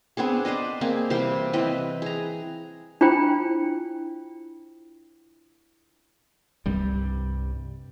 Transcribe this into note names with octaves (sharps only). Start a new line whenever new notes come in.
B3 C4 D4 G#4
B4 C5 D5 D#5
A#3 C4 G#4
C3 E3 G3 C5
E3 C4 B4 D#5
G#4 A#5
D4 E4 F4 C5 G5
C2 G2 C3 G3